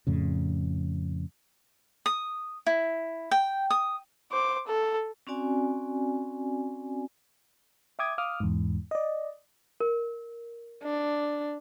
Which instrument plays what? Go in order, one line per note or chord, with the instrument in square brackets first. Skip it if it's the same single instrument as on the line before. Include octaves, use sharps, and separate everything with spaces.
[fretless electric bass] F2 A2 C#3
[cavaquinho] D#6
E4
G5
D#6
[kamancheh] C5 D6
A4
[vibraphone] C4 C#4 F#4 D5 G#5
[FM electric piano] E5 G5 D6 D#6 G#6
F5 D6 D#6 F6
E2 G#2
D5 D#5
[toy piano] A#4
[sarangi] D4